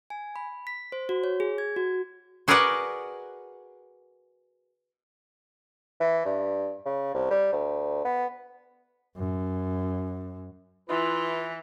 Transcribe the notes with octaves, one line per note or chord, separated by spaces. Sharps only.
G#5
B5
B6
C5
F#4
C#5
G#4
G#6
F#4
F#4 G#4 A#4 B4 D5 F#5
E3
G2
C#3
C2
G3
D2
B3
F#2
E3 E4 F4 B4